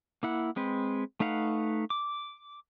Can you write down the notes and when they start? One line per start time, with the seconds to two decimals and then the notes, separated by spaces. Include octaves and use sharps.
0.23 A#3 E4 F#5
0.56 G#3 C4 B4
1.20 A3 D#4 B4 F5 F#5
1.90 D6